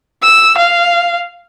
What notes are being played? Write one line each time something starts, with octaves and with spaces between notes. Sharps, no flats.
E6
F5